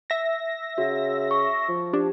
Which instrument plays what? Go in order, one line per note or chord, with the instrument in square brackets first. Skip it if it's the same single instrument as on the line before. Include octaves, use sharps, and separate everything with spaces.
[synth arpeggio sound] E5 A#6
[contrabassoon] C#3 [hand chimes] F#4
[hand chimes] C#6
[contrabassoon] F3
[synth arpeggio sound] D4 [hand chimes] G4